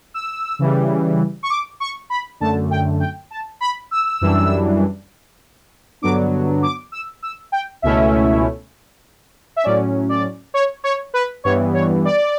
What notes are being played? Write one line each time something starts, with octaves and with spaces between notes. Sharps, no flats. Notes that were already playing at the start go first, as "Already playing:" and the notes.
E6
C#3 E3 G3
C#6
D6
C#6
B5
F#2 D3 A3 A5
G5
G5
A5
B5
E6
F#2 E3 G3 D4
G2 D3 F#3 B3 D4 D6
D6
E6
E6
G5
C#2 B2 A3 C#4 E4 E5
E5
A2 F#3 C#4 D5
D5
C#5
C#5
B4
G2 E3 G3 B3 C#5
C#5
D5